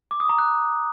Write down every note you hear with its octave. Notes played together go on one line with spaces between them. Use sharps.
D6
D#6
A#5
F#6